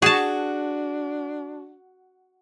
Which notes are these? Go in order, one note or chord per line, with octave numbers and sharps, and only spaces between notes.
D4 F#4 G#4 A5